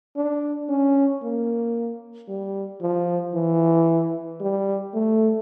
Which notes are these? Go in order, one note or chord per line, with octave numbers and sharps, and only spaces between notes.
D4
C#4
A#3
G3
F3
E3
G3
A3